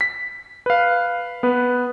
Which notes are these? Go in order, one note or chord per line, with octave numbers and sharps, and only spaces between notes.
B6
B4 F5
B3 B4